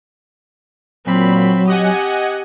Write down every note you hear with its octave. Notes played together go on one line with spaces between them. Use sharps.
A#2 F#3 C4 B5
G4 D#5 F#5 G#5